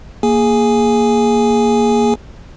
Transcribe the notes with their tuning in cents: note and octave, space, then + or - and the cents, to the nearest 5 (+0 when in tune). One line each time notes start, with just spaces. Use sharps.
A#3 +0 G#4 +0 G#5 +0